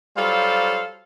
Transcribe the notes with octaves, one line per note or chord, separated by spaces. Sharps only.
F#3 G3 F4 A4 C5 F5